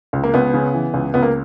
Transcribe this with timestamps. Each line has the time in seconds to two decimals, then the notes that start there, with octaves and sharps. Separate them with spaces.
0.13 C#2
0.24 A#3
0.34 C#2 B3
0.54 C#3
0.74 E3
0.94 C#2
1.14 C#2 B3
1.23 A#3